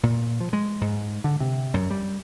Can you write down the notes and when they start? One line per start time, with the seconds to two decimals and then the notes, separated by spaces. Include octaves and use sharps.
0.03 A#2
0.40 F3
0.53 G#3
0.81 G#2
1.24 D3
1.40 C3
1.74 F#2
1.90 G3